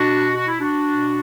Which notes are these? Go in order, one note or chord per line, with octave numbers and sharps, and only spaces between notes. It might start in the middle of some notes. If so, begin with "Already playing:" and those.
Already playing: B2 D4 F#4
F#4
E4
D4 F#4
B2